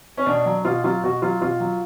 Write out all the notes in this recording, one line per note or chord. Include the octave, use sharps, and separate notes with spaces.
C#4
B2 D4
F#3
B2 F4
F#3 F4
B2 F#4
F#3 F4
B2 F4
F#3